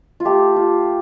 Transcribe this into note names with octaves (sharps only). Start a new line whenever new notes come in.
F4
A3 G4
F4